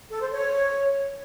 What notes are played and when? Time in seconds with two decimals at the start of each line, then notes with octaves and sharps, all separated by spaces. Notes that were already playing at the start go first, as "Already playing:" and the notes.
0.11 A4
0.21 C5
0.31 C#5